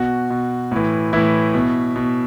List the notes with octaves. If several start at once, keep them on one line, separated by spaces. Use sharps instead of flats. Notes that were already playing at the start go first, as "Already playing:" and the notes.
Already playing: B2 F#4
B2
A2 E3
A2 E3 E4
B2
B2